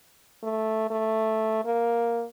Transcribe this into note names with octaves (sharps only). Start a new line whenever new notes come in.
A3
A3
A#3